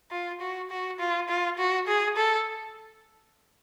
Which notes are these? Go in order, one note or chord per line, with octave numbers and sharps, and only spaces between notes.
F4
F#4
F#4
F4
F4
F#4
G#4
A4